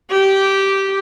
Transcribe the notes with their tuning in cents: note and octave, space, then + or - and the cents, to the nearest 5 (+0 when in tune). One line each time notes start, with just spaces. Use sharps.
G4 -10